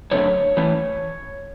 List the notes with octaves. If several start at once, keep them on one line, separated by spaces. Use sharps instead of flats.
F#2 D3 A3 C#4 C#5
E3 A3 C#4